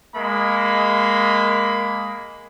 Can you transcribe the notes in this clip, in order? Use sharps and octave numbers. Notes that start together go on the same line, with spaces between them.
G#3 A#3 B5